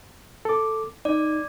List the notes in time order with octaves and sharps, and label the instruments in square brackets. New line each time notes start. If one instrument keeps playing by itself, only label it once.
[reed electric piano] A4 D6
[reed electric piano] D#4 [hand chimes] D5